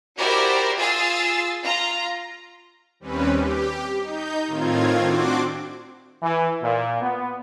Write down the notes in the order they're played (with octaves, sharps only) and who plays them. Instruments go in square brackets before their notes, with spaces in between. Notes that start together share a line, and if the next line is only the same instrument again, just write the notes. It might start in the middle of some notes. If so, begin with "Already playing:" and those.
[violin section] E4 F#4 G4 A#4 C5 D5
F4 G#4 E6 A6 C7
F4 A#5
[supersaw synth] D#2 G3 C4 C#4 B4
G4
D#4 G6
A2 D#3 C4 F4 G#6
C4 D4 F#4 C6 D6
[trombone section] E3
A#2
B3